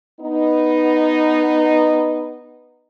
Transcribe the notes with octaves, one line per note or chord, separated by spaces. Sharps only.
B3 D#4